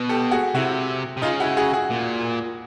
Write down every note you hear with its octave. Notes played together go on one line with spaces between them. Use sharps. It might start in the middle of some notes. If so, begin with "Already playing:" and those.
Already playing: B2
G4 A4
F#4 G#4
C3 E4 F#4
C3
C#3 D#4 F4
E4 F#4
F#4 G#4
F#4 G#4
A#2